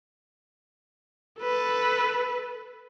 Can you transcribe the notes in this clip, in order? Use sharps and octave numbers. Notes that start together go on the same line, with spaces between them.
A4 B4